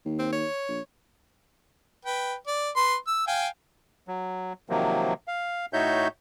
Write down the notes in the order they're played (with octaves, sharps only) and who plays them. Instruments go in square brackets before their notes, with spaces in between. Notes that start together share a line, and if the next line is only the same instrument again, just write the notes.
[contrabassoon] D#2
[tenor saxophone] C4
C#5
[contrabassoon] A#1
[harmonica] B4 G5
D5
B4 C6
E6
F5 G5 G#5
[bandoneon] F#3
C3 D#3 F3 F#3 A#3
F5
A2 D#4 F#4 C#5 E5 G6